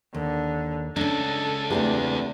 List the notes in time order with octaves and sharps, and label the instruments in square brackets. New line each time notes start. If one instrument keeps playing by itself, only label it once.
[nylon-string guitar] D#2 [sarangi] D3
[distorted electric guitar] C#2 [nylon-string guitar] C#4 D4 [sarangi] A4
[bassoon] E2 [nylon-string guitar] A3 C4 G4 [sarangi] D4